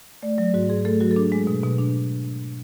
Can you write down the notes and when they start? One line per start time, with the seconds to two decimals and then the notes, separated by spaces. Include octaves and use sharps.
0.23 A3 D5
0.38 F#3 D5
0.54 G#2 F#4
0.70 G#2 G#4
0.85 A3 A4
1.00 F#3 F#4
1.11 A4
1.16 D4 G#4
1.32 G#3
1.47 B2
1.63 B2
1.78 D4